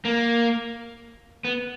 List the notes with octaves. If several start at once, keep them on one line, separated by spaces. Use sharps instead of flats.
A#3
B3